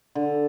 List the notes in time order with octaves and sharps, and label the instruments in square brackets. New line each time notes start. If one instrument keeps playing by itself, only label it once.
[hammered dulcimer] D3